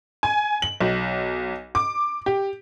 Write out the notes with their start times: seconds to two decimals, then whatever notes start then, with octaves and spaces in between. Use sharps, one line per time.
0.23 G#5
0.62 F#7
0.81 B1
1.75 D6
2.26 G4